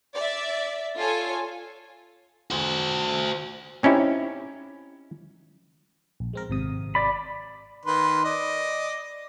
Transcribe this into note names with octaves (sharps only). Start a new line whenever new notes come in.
D5 E5
F4 A4 C#5 G#5
F#4 C5
C4 C#4 D#4 E4 G4
A#1
G#3 C4 A#4
G#1 C3 D#6
D5 B5
D#3 B4 C6
D5 D#5